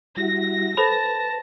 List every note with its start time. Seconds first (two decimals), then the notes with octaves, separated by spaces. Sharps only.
0.17 G3 E4 F#4 A#6
0.77 A4 B4 C5 A5 B5